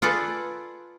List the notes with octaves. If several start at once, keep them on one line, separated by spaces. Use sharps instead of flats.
F4 G#4 A4 B4 D5